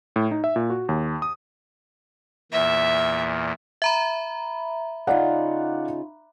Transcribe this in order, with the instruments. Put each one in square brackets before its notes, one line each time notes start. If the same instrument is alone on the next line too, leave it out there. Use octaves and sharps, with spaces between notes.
[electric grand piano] A2
D#4
E5
A#2
F#4
D#2
D#6
[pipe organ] E2 A#2 [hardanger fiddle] E5
[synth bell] E5 A#5 B5
[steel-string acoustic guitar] C#3 D#4 F4 [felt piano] D5 F5 F#5